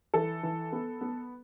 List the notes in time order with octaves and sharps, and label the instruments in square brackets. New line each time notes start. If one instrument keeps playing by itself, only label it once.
[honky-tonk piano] E3 A4
E3
B3
B3